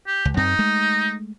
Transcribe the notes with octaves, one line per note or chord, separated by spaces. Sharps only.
G4
C#2
F#2 C4 D#4
G#3 A3